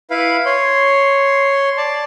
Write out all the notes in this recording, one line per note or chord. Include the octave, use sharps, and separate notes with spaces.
E4 B4 F5
C#5 C6
D5 A5